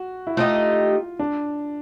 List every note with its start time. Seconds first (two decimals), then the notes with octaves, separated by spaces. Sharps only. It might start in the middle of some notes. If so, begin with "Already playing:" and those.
Already playing: F#4
0.27 E4
0.37 A3 C4 D#4 F4 G4
1.19 D4